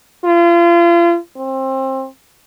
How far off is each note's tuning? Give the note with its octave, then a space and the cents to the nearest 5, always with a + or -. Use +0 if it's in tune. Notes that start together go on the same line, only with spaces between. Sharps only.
F4 -35
C4 +25